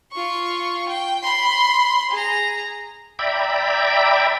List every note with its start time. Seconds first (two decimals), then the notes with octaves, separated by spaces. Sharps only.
0.12 F4 C#6
0.88 G5
1.23 B5 C6
2.10 G#4 A#5
3.19 D5 E5 G5 A#5 B5